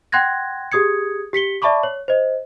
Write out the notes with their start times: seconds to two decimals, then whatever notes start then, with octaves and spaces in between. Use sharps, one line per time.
0.12 F#5 G5 C6 F#6 G#6 A#6
0.72 G4 G#4 D#6 G#6 C#7
1.33 G4 B6 C#7 G7
1.62 D5 E5 A5 B5 C#6 D6
1.83 C#5
2.08 C5 D#5